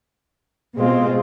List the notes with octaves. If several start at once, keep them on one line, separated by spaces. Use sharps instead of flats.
B2 G#3 C4 F4